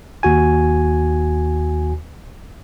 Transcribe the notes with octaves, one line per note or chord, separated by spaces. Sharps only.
D#2 F#4 G#5